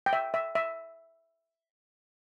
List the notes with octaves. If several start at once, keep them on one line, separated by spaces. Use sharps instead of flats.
G5
E5
E5
E5